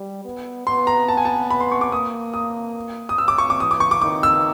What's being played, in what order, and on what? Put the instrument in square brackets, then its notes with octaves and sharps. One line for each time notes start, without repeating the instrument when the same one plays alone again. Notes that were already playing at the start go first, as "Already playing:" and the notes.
Already playing: [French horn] G3
B3
[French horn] B3 [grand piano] C6
[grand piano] A#5
A5
G#5
A5
B5
C6
C#6
D6
[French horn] A#3 [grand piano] D#6
[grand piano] D#6
D#6
E6
D6
C#6
D6
[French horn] E3 [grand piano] D#6
[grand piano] D6
C#6
D6
[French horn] D#3 [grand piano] D6
[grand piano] E6